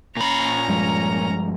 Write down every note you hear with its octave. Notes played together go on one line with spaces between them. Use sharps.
A#2 C#4 A#5 B5
G2 F3 G#3